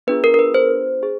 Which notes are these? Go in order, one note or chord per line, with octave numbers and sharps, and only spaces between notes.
B3 D4 F4 G#4 B4
A#4
A#4
B4
C5
G#4